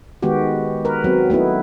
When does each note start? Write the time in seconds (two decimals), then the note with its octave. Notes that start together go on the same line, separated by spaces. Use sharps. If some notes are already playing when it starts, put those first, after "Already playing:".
0.22 D#3 G#3 B3 F#4 G4
0.85 A#4 B4
1.04 F#3 B3 C4
1.30 A3 B3 D#4 E4